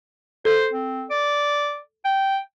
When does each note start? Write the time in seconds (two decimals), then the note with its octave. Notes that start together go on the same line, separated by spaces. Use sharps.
0.45 A4 C5
0.73 C4
1.10 D5
2.05 G5